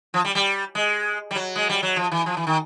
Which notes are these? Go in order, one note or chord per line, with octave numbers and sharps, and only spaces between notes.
F3
G3
G3
G#3
G3
F#3
G#3
G3
F#3
F3
E3
F3
E3
D#3